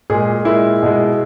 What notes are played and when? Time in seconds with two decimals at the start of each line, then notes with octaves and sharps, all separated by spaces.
0.10 A#2 G#3 G#4
0.45 A#2 G#3 E4
0.83 B2 G#3